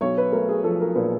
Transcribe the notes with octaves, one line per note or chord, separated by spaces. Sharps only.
B1 C#5
B4
A3 A#4
G#4
F3 A4
A#4
A#2 B4